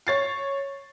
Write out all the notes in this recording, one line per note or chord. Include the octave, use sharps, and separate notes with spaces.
C#5 A6 C7